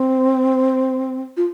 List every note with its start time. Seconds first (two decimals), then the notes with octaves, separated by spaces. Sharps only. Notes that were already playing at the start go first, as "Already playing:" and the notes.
Already playing: C4
1.37 F4